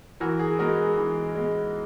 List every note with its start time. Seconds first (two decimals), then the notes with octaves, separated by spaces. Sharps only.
0.20 E3 F#4 A#4
0.39 G#4
0.59 G#3 B3 F#4 A#4
0.78 G#4
0.98 E3
1.35 G#3 B3